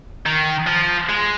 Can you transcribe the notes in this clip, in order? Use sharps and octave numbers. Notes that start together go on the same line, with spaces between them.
D#3
F3
G#3